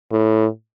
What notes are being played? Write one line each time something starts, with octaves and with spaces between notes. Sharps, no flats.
A2